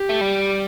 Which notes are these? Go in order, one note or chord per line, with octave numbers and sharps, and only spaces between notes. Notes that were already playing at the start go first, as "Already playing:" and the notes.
Already playing: G4
A3
G3